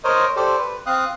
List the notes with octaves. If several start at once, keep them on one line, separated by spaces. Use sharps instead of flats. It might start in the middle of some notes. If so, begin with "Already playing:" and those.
A#4 C5 C#5 D#5
G4 A4 C5 D5
B4
C4 F5 D#6 F#6